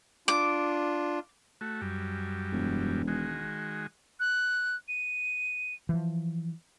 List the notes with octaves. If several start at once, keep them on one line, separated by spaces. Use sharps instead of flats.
D4 F4 D6
A3 F#4
F#2 G3
E1
D#3 G#3 F#4
F#6
D#7
E3 F3